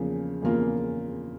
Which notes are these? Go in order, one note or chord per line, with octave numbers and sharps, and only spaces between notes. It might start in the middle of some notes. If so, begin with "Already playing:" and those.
Already playing: E2 C#3 F3 A#3
E2 C#3 F3 A#3 F4